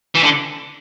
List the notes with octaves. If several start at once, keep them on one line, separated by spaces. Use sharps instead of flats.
E3
D3